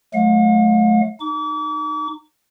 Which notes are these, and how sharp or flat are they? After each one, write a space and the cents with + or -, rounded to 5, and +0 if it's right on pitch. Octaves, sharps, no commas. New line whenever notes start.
F#3 -5 A3 -35 F5 +45
D#4 -20 D6 -40